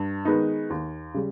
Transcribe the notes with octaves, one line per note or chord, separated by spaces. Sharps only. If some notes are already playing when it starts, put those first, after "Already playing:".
Already playing: G2
D#3 G#3 B3 D#4
D#2
C#3 G3